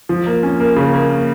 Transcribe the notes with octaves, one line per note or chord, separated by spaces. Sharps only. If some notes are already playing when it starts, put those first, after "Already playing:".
F3
A#3
C#4
A#3
C#3
A#3
A#3